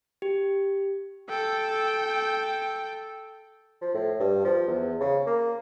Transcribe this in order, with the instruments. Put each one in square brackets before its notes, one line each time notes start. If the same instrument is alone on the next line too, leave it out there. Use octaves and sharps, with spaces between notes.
[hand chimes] G4
[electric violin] A4 G5
[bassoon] F3
A2
G2
F3
E2
C#3
A#3